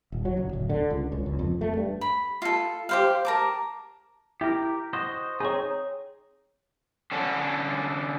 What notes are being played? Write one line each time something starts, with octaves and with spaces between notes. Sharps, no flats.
D#1
F#3
F#1
D1
D3
C#2
C#2
C#2
F2
A3
G2
B5
F4 A4
G4 C5 F5
A#4 A5 D6
E4 G4 A#4
F#4 C5 D#5
C4 D#4 G#4 C#5
D3 C#4 A4